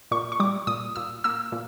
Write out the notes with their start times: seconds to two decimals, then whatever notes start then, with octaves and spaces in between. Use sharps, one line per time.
0.11 A#2 C#6
0.32 C#6
0.40 G3 D6
0.67 A#2 D#6
0.96 A#2 E6
1.24 A#3 E6
1.52 A#2